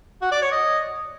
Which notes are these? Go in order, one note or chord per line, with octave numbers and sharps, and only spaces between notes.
F#4
D5
C#5
D#5